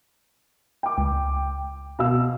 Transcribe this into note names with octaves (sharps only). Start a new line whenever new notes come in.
G5 D6
C#2
B2 F5 E6